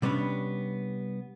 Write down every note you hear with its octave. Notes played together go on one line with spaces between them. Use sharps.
C3 G3 B3 C#4 D4